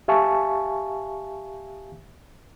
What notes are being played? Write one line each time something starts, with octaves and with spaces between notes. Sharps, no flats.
G4 E5 F5 G#5 A5 C#6